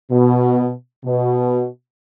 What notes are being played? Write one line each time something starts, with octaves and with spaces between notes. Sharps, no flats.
B2
B2